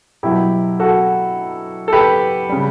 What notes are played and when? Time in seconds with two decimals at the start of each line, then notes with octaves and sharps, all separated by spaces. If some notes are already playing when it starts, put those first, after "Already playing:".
0.23 B2 F#3 E4 G4
0.80 F#4 A4
1.88 A4
1.93 G4 B4
2.49 C#3 G3